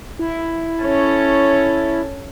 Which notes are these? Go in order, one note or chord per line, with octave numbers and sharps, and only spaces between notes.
E4
C#4 A4 C#5